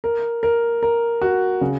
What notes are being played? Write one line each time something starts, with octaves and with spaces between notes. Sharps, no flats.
A#4
A#4
A#4
F#4
C#3